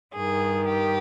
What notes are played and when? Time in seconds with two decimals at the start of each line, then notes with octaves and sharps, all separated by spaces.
0.15 G2 D#3 G#4
0.69 G4